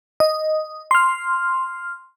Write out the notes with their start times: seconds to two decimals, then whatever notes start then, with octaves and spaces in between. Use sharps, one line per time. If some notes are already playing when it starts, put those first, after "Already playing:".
0.20 D#5
0.91 C6 F6